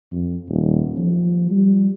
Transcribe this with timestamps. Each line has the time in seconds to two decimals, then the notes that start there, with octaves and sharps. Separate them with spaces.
0.11 F2
0.49 D#1
0.98 F3
1.50 G3